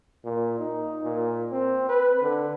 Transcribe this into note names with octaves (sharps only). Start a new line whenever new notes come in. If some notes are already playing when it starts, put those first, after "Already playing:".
A#2
D#4
A#2
C4
B4
D3